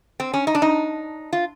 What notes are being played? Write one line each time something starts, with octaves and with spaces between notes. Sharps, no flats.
C4
C#4
D#4
D4
D#4
F4